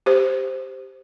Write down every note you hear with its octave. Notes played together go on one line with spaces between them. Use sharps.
G4 C5